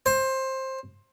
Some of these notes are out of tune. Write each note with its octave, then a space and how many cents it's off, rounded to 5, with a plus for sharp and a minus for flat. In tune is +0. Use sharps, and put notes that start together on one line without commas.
C5 +15